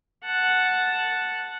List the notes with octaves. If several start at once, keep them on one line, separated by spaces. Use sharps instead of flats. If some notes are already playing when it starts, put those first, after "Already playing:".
F#5 A5